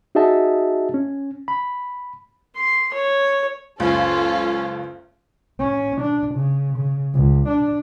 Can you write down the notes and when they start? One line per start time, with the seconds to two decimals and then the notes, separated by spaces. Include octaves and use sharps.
0.15 D#4 F#4 G#4 D#5 E5 A5
0.94 C#4
1.48 B5
2.56 C6
2.93 C#5
3.80 F#1 C#2 C#4 F4 A4
5.59 C#4
6.01 D4
6.34 C#3
6.77 C#3
7.14 C#2
7.48 D4